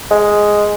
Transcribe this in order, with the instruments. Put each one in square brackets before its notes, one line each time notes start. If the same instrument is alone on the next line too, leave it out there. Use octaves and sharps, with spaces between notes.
[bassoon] G#3